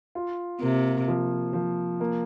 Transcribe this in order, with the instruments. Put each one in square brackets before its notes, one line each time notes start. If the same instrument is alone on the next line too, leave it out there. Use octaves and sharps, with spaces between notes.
[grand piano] F4
[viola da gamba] C3 [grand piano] A#3
[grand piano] F3
F3
A#3